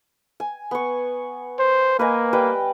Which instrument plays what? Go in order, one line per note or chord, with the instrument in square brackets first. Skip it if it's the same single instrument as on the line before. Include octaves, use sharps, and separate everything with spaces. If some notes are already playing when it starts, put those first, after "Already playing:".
[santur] G#5
B3 C#6
[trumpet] C5
[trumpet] A#3 [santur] B4 D#5 G#5
[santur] G3 B4 G5